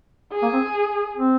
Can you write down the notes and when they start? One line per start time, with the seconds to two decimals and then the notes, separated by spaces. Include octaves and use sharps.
0.32 G#4
0.42 A#3
0.53 C4
1.16 C4